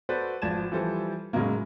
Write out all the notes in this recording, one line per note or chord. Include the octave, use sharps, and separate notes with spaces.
F#4 A4 B4 C5 D5
G#1 F3 D5 A5 G#6 E7
E3 F3 G3 A4 C5
A2 C#3 F#3 G#3 A#3